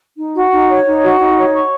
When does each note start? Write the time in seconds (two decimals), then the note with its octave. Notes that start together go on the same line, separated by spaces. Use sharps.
0.17 D#4
0.34 F#4
0.50 D#4
0.68 C#5
0.85 D#4
1.01 F#4
1.19 D#4
1.35 C#5
1.53 C#6